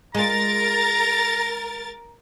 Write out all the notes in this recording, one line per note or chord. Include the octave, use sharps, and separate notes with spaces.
G#3 F4 A#4 A#5 A6